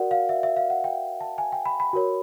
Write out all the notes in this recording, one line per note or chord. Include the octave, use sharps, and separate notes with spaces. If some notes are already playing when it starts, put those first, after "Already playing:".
Already playing: F#4 A#4 D5 F#5
F5
E5
E5
F5
F#5
G5
A5
G#5
G5
B5
B5
F#4 A#4 C#5